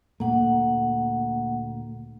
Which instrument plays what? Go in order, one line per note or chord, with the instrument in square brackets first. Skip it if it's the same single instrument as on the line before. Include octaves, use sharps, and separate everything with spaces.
[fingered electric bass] D2 A#2 A3 [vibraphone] A#3 F#5